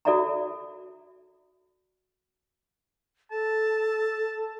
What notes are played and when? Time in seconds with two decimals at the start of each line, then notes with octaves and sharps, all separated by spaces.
0.05 F#4 A4 D5 E5 A5 A#5
3.32 A4 A5